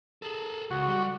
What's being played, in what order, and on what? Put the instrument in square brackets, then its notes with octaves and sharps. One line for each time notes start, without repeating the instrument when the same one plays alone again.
[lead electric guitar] G#4 A4
[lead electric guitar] C#2 [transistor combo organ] F#4
[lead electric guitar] G3